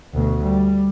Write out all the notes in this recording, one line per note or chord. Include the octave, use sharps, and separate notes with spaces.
D2 B2
G3